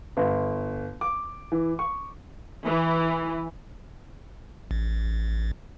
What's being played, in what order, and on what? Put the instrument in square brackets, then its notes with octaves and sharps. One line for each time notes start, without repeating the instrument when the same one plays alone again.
[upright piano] G1
D6
E3
C#6
[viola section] E3
[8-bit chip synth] A1